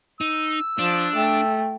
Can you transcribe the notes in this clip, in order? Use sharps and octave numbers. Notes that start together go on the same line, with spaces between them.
D#4 E6
F3 D4
A3 G5